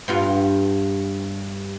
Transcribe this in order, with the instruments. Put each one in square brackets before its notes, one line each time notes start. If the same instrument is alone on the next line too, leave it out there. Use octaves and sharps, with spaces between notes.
[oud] G2 B3 F4